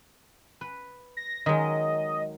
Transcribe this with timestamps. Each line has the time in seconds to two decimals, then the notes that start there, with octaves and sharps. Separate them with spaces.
0.61 B4
1.17 A#6
1.46 D#3 F#3 G#3 D#5